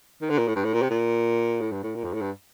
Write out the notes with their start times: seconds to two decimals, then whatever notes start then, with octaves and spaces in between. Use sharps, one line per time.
0.22 D#3
0.30 D3
0.39 A#2
0.48 A2
0.56 G2
0.65 A2
0.73 A#2
0.82 C3
0.90 A#2
1.61 A2
1.72 G2
1.83 A2
1.95 A#2
2.04 F2
2.14 A2
2.22 G2